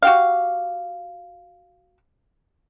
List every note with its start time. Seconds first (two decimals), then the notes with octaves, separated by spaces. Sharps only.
0.02 F#4 G4 F5